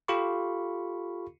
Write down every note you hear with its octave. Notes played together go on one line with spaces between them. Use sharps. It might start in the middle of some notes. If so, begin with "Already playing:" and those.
F4 G4 A4 F5 B5 C#6